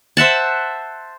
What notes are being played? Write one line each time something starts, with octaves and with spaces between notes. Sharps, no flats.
C5 E5 F#5 A5